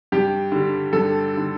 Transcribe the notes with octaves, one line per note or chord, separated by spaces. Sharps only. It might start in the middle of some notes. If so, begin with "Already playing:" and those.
G2 G4
D3 G3
G2 A4
D3 G3